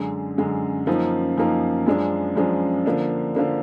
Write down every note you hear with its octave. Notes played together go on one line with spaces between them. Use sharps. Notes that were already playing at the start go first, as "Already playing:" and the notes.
Already playing: F#2 D3 G#3
F#2 D3 G#3
F#2 F3 A#3 D#4
F#2 F3 A#3 D#4
F#2 F3 G#3 D4
F#2 F3 G#3 D4
D3 F3 A#3 D4
D3 F3 A#3 D4